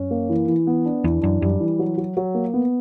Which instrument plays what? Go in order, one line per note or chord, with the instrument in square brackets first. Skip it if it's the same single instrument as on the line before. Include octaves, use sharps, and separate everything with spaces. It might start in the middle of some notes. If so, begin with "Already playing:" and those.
Already playing: [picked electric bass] F#2 [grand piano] C#4
[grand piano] A#3
E3
E3
B3
D4
[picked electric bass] E2 [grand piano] E3
[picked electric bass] F#2 [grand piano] D4
[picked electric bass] F#2 [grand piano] G3
[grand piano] E3
F#3
F#3
F#3
A#3
B3